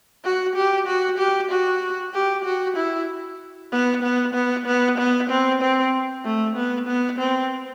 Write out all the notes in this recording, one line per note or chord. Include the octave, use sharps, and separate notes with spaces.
F#4
G4
F#4
G4
F#4
G4
F#4
E4
B3
B3
B3
B3
B3
C4
C4
A3
B3
B3
C4